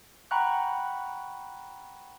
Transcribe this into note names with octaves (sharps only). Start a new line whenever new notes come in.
F#5 G5 A#5 B5 C#6 F#6